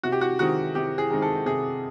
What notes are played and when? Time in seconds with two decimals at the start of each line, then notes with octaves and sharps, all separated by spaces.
0.03 C3 F#4
0.12 G4
0.21 F#4
0.39 D#3 G#3 C4 D#4 F#4
0.75 C3 G4
0.98 G#4
1.10 D#3 G#3 C4 D#4
1.22 A4
1.46 C3 G#4